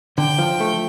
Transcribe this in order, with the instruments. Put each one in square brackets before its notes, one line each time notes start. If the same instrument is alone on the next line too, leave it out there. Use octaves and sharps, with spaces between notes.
[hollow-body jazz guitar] D3 [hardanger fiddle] G5
[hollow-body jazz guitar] F3
A3